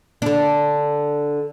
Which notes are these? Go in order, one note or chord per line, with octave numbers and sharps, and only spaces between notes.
D3 D4